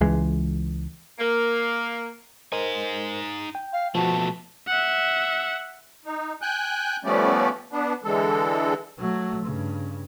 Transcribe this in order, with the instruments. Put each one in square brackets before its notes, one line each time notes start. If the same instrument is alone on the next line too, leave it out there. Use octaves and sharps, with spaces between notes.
[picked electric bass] C#2 E3 G#3
[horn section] A#3
[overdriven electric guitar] D#4 G#5 [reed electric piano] A#4 C5 D#5
[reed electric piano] G5
[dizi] F5
[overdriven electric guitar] B2 A3 [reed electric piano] F3 F#4 [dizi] A5
[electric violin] E5 F#5
[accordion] D#4
G5 G#5 F#6 G6
F3 G3 A3 B3 C#4 D5
B3 D4
D3 E3 G#3 A4
[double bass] F#3 A3
G2 C#3